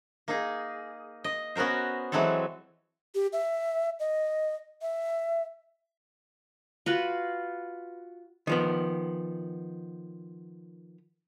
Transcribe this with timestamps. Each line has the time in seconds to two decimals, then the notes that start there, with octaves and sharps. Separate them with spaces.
0.28 A#3 D#4 G#4
1.24 D#5
1.55 B3 C#4 F#4 A#4 C5
2.12 E3 F#3 G#3 C4 A4
3.15 G4
3.33 E5
3.99 D#5
4.82 E5
6.86 F4 F#4 B4
8.47 D#3 F3 B3